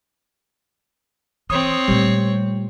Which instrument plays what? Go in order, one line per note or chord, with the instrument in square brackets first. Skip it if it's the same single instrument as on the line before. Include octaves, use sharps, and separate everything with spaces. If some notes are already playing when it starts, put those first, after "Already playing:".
[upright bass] E3 [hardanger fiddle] C4 C#5 [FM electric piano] D#6
[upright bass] A#2 A3 [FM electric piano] G3